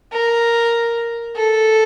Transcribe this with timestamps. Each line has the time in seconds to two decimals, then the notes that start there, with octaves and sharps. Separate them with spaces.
0.13 A#4
1.36 A4